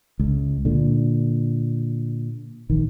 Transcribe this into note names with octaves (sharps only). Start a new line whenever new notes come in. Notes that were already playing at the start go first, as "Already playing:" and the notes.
C#2
A#2 D3
A#1 D#3